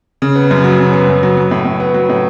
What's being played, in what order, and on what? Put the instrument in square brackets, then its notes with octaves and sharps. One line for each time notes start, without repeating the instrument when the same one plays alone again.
[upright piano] C#3
B3
F#2
F#3
C#3
B3
F#2
F#3
F#3
A2
A2
B3
F#3
A2